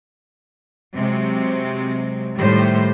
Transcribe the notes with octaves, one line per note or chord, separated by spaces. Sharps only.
C3 F#3 G#3 C4
A2 D#3 G3 G4 C5